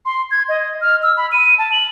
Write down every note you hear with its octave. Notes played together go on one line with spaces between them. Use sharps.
C6
G#6
D#5
F6
E6
B5
D#7
A5
F#7